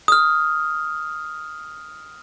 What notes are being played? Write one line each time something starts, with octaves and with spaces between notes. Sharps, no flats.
D#6 F6